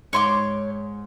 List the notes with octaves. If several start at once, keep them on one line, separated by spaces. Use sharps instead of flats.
G#2 C#5 C6 D6